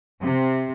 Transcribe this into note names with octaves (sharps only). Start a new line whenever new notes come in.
C3